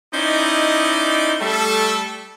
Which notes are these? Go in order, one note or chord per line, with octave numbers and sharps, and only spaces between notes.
C#4 D#4 E4 C5 D5 D#5
G3 A3 A4